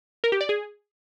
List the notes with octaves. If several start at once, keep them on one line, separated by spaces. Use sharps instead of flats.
A#4
G4
D5
G#4